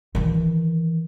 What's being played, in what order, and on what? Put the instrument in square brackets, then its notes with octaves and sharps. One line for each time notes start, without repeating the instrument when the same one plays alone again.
[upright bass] D#3 E3